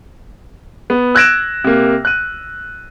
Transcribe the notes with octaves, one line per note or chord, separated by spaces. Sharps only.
B3
E6 F#6 G#6 A#6 D7 E7
C3 A#3
F#6 D#7